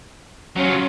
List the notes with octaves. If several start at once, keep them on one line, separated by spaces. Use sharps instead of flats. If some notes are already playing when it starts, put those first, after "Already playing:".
F#3 C#4 F4